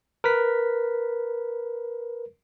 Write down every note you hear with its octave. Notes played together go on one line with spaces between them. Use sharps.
A#4 B4 B6